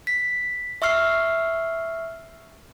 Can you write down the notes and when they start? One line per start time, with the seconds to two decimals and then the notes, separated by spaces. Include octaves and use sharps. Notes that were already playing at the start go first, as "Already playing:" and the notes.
0.07 B6
0.82 E5 C#6 E6 F6 C7